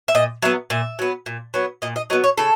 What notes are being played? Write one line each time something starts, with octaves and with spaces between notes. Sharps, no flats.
E5
A#2 D#5
F#3 B3 E5
A#2 E5
F#3 B3
A#2
F#3 B3
A#2 D#5
D#5
F#3 B3 D#5
C#5
C#3 A4